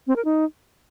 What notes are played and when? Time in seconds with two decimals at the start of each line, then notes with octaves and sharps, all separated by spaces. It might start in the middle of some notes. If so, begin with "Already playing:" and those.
0.07 C4
0.16 A#4
0.25 D#4